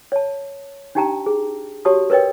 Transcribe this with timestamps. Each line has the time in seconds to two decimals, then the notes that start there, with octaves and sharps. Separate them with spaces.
0.12 C#5 A5
0.95 D4 D#4 G4 G5 A5 A#5
1.26 G#4
1.85 F#4 G4 C#5 A5 D#6
2.10 A#4 B4 C#5 D#5 G5